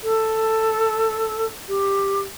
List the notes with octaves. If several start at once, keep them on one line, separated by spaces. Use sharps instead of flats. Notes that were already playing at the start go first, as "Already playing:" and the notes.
A4
G4